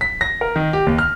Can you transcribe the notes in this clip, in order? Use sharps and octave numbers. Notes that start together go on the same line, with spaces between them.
B6
A#6
A#4
D#3
G4
D#2
F6